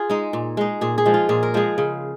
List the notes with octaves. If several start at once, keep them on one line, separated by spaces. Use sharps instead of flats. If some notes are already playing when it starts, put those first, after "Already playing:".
Already playing: F4 G#4
G#3 D#4
A#2
G#3 D#4
A#2 G#4
G#4
F3 G#3
F4
A#2 G#4
A#4
F3 G#3 G#4
C#3